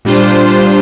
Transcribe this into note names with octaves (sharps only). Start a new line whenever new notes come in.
A#2 G3 D4 F4 C5